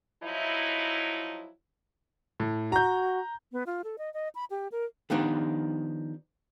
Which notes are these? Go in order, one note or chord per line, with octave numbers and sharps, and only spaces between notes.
F3 F#3 D#4 E4
A2
F#4 A#5 G6
B3
F4
A4
D#5
D#5
B5
G4
A#4
D#3 F3 B3 D4 D#4 G4